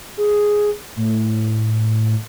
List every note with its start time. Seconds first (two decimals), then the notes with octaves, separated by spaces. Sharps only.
0.17 G#4
0.96 A2